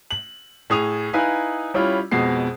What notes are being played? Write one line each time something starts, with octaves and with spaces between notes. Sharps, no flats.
F#7
A2 G#4 D#6 F7
D#4 E4 B4 F5 G#5
G3 C#4 E4 F4
F2 B2 G#3 C7